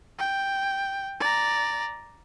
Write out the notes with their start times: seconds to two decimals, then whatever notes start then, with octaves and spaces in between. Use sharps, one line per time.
0.19 G5
1.20 D5 A#5